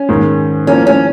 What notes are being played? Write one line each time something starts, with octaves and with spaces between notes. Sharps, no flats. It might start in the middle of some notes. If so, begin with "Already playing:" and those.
Already playing: C#4
G#2 D#3 G#3
A2 F3 A#3 C#4
C#4